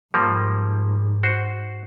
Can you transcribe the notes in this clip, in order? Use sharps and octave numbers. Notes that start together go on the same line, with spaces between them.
G#2 F3 G3 A#3
F#4 C5